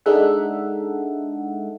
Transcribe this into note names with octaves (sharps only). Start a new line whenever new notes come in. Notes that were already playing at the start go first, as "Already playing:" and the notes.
G#3 D4 D#4 A4 E5 F#5